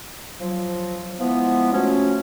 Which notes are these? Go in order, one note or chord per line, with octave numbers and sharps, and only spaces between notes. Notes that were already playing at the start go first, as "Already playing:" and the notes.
F3 F#3
E3 F3 G#3 B3
F3 F#3 A3 C#4